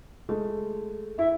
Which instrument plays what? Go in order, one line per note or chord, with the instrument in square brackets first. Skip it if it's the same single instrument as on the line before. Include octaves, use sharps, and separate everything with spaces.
[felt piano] G#3 A3
[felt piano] E4 [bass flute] E5